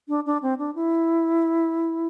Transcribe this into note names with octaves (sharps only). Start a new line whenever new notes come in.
D4
D4
C4
D4
E4